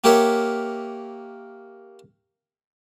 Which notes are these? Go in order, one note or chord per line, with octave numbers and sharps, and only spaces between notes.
A#3 G4 A#4 C#5 E5 F#5